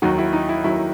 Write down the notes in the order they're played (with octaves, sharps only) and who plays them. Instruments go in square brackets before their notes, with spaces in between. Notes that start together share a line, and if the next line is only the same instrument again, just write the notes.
[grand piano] D#2 D#3 F#3 D#4 F#4
E4
D#4
E4
D#2 D#3 F#3 E4